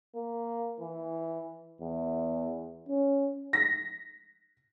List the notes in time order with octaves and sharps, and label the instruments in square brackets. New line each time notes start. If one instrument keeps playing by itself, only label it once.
[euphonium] A#3
E3
E2
C#4
[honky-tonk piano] A#6 B6